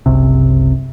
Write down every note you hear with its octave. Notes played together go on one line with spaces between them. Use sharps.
F#1 C2 C3